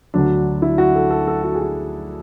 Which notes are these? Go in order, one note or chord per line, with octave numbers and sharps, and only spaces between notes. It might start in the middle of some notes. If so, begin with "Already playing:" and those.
D2 D3 F#3 D4
E4
F#4
A4
A4
A4
F#4
G#4
F#4